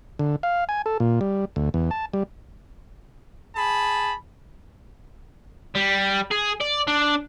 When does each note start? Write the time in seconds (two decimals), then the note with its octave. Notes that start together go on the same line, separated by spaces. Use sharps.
0.19 D3
0.43 F5
0.69 G#5
0.86 A4
1.00 A#2
1.21 G3
1.56 D2
1.74 E2
1.91 A5
2.13 G3
3.56 G#4 A5 B5
5.75 G3
6.31 G#4
6.60 D5
6.88 D4